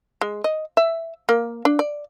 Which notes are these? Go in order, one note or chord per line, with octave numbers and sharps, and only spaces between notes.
G#3
D#5
E5
A#3
D4
D5